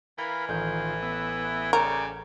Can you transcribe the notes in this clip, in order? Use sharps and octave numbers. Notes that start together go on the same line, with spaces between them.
E3 A#4 F5 B5 G#6
A1 D#3 F4 G6
B3 E5
C#3 A#4 D5 G5